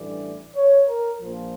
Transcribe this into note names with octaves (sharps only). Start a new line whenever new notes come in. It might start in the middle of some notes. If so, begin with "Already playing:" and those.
Already playing: A1 G2 E3 A3 D5
C#5
A#4
A#1 A#2 F3